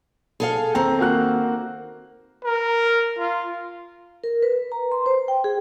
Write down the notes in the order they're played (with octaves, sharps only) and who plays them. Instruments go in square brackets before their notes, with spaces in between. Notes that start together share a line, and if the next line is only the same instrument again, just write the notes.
[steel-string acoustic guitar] G#4 A4 F5
[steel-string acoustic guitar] D#3 C4 [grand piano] A#5
[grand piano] A#3 F#4 F#6
[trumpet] A#4
F4
[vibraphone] A#4
B4
A#5
C6
C5
G5
G#4